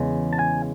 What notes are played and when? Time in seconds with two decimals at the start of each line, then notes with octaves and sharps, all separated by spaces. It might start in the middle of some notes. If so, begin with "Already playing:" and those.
Already playing: E2 C#3 G#3
0.33 A5
0.39 G#5